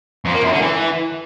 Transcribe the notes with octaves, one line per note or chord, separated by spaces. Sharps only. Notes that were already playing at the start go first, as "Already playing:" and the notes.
F2
A#3
F#2
D3
E3